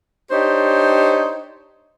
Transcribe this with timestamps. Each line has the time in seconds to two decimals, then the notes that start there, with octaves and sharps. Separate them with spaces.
0.31 D4 D#4 G4 C5 C#5